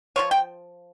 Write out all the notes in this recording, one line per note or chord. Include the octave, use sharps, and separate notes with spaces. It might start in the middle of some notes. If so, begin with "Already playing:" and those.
F3 A#3 F4 C#5
G5